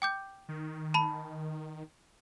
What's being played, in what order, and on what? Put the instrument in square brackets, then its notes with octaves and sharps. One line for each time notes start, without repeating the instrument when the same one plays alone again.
[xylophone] G5 D6 G6
[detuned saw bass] D#3
[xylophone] A5 B5